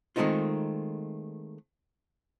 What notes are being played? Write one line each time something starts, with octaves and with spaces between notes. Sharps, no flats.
D#3 G#3 A3 C4 D#4 F4